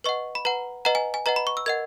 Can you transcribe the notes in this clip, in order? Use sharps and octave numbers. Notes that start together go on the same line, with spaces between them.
B4 D#5 F#5 C#6
B5
B4 F#5 A#5
B4 D#5 F#5 A#5
G#5
G#5
B4 D#5 F#5 A#5
B5
C#6
E6
A#4 D#5 F#5 G#6